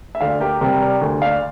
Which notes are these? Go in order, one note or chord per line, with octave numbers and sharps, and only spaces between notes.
E5
D2 D5 F5
G4 A#4
C3 G3 G4 A#4
A#4 D5
D2
D5 F5